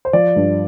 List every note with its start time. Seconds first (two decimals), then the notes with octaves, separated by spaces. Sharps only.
0.05 C5
0.13 F3 D5
0.36 G2